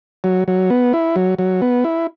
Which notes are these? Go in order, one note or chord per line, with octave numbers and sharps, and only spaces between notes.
F#3
F#3
B3
E4
F#3
F#3
B3
E4